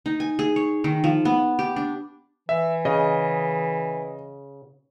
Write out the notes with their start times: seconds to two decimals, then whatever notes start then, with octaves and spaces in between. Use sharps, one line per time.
0.06 D#4
0.20 G#5
0.39 G#4
0.56 C#5
0.84 D#3
1.04 F3
1.25 B3
1.59 G4
1.76 D4
2.49 E3 E5
2.85 C#3 D#5